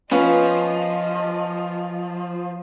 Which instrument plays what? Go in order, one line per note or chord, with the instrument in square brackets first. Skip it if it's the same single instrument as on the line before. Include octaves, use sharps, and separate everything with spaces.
[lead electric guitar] F3 [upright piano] B3 C#4 F4 [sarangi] D#5